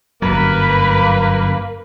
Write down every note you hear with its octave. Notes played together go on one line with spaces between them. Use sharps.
G1 F#2 F#3 A#3 B4